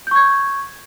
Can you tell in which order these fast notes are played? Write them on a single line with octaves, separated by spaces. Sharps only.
G6 C#6 G#6